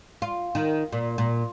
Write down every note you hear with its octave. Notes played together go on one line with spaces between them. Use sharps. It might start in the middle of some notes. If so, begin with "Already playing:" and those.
F4
D#3
A#2
A#2